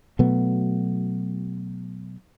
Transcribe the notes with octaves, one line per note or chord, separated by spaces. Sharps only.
B2 F#3 A3 B3